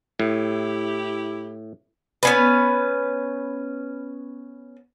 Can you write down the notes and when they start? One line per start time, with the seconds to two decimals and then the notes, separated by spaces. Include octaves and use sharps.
0.20 A2 E4 G4
2.23 B3 C#4 B4